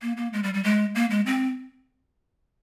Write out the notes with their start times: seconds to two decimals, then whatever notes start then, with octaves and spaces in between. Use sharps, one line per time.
0.02 A#3
0.17 A#3
0.33 G#3
0.44 G3
0.54 G3
0.64 G#3
0.95 A#3
1.10 G#3
1.26 C4